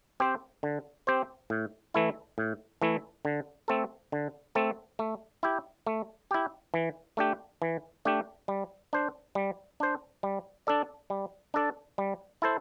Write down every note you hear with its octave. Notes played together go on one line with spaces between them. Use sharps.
C4 G4 C5
D3
C4 G4 C5
A2
E3 A3 E4
A2
E3 A3 E4
D3
A3 C4 A4
D3
A3 C4 A4
A3
E4 G4
A3
E4 G4
E3
A3 D4 G4
E3
A3 D4 G4
G3
D4 C5
G3
D4 C5
G3
D4 A4 D5
G3
D4 A4 D5
G3
E4 A4 C5